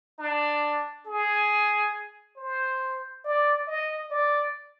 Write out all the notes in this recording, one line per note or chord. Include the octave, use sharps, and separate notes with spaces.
D4
G#4
C5
D5
D#5
D5